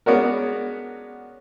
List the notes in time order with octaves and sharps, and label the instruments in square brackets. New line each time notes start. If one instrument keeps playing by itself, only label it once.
[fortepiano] G#3 B3 C#4 D4 F#4 A#4